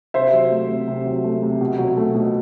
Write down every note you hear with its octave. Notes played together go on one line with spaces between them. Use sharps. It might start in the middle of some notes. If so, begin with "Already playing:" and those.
C3 C5 E5
F#3
A3
C3
C3
F#3
A3
C3
B2
F#3
A3
B2